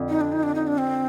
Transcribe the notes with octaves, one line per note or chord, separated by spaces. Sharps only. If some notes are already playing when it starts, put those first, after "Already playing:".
Already playing: F2 D3
D#4
D4
D#4
D4
D#4
D4
C4